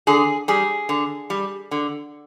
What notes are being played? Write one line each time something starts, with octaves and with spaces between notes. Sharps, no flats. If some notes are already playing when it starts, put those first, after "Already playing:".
D3 G#4
G3 G#4
D3
G3
D3